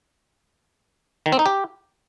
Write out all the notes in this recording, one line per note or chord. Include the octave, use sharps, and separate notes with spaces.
D#3
C4
D#4
G4